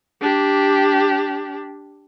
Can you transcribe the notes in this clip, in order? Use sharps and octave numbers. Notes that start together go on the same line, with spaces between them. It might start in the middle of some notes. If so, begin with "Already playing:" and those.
D4 G4